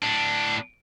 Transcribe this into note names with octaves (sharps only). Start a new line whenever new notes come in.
A2 D4